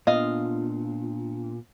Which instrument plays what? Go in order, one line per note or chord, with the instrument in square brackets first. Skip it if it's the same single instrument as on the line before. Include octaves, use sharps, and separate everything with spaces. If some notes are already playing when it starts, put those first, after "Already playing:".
[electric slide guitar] A#2 [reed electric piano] B3 F4 [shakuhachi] D4 [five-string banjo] D#5 F5